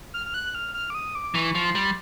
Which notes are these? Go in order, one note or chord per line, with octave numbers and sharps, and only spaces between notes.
F6
F6
F#6
F6
F6
D6
D#6
D6
E3 C#6
F3
C6
G3